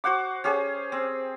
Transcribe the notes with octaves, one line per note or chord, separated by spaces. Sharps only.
F#4 C5 F#5 D6
C#4 G4 G#4 C5
C4